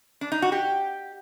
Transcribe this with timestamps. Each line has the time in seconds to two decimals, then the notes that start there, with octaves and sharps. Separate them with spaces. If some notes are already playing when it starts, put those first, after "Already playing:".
0.21 D4
0.32 D#4
0.42 F#4
0.52 G4